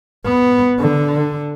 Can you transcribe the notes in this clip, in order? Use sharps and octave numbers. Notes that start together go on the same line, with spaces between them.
B3
D3